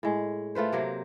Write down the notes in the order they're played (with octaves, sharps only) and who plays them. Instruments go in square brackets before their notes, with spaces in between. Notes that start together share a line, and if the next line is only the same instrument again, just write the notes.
[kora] A2 G#3
A3 F4 B4 C5
C3 F#3 A#3 C5